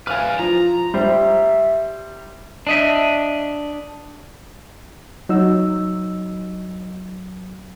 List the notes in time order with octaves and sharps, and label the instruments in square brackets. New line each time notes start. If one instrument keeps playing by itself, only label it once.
[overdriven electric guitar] B4 D5 [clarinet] F5 [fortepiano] G#5 F6
[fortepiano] F3 [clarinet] F4 [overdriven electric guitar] A#5
[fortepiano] G3 C5 [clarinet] E5
[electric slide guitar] D4 D#5 E5
[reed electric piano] F#3 E6 [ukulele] D#4